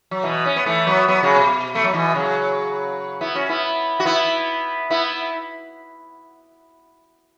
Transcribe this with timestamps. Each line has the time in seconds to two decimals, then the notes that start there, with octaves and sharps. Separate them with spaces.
0.11 F#3
0.23 B2 E3
0.46 C#4
0.56 B3
0.66 E3 A3
0.87 F#3 B3
1.08 F#3 B3
1.23 C#3 F#3
1.36 B2
1.75 A3
1.84 F#3
1.93 B2 E3
2.15 C#3 F#3
3.21 B3 E4
3.35 C#4 F#4
3.49 B3 E4
4.00 F#4
4.05 B3 E4
4.90 B3 E4